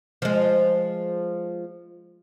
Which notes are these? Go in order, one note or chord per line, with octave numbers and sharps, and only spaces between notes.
F3 G#3